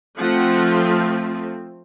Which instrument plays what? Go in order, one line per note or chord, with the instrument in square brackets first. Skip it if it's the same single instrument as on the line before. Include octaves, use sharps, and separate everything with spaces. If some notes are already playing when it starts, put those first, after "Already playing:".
[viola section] F3 A3 C4 F#5